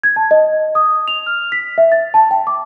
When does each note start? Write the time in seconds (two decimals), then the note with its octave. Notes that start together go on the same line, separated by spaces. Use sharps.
0.04 G#6
0.16 A5
0.31 D#5
0.75 D#6
1.08 F7
1.27 F6
1.52 B6
1.78 E5
1.92 A6
2.14 A5
2.31 G5
2.47 D6